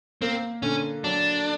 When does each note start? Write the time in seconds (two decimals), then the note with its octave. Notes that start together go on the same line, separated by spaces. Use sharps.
0.22 A#3 C4
0.62 D3 C#4
1.04 F#3 D4